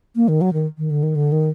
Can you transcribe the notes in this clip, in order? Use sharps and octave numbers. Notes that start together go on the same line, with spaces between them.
A#3
D#3
F#3
D#3
D#3
D3
D#3
D3
D#3